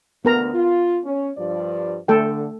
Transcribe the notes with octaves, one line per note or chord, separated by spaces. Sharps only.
D2 B3 A#4 A#5
F4
C#4
G2 F3 D5
D3 A3 A4 G5